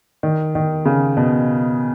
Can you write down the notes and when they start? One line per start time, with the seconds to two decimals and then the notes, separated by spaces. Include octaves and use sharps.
0.23 D#3
0.55 D#3
0.85 C#3
1.17 B2